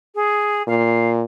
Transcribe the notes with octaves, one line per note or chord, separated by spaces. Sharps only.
G#4
A#2 F5